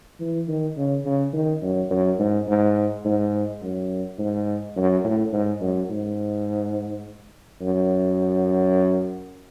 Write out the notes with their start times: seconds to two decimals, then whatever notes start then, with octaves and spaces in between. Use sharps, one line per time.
0.20 E3
0.48 D#3
0.77 C#3
1.05 C#3
1.33 D#3
1.62 F#2
1.90 F#2
2.19 G#2
2.48 G#2
3.05 G#2
3.62 F#2
4.19 G#2
4.76 F#2
5.04 A2
5.33 G#2
5.61 F#2
5.90 G#2
7.61 F#2